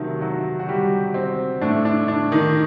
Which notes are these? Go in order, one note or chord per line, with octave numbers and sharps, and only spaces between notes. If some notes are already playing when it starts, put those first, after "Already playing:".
Already playing: C3 D#3 F#3 A3 D#4
F#3 F#4
F#4
G3 G4
C4
A2 A3 D4
D4
D4
D#3 D#4